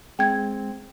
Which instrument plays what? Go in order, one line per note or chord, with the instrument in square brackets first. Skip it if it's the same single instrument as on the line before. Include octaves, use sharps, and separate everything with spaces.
[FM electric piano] G#3 [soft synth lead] C4 [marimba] G5 G#6